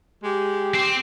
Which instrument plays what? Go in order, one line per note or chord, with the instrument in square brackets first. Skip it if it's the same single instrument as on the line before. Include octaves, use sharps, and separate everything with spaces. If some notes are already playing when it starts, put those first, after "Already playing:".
[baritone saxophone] G#3 [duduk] G4
[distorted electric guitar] C4